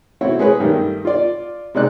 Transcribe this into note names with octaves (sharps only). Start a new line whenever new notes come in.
A3 C4 E4 F#4 C#5
G#3 G#4 B4 C#5
G2 D#3 G3 A3
F4 D5
C3 G#3 D#4 D5 F#6